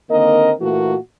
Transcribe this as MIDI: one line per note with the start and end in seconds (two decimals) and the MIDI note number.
0.10 0.51 50
0.10 0.51 51
0.10 0.51 58
0.10 0.51 60
0.10 0.51 70
0.10 0.51 75
0.60 0.95 46
0.60 0.95 52
0.60 0.95 57
0.60 0.95 58
0.60 0.95 66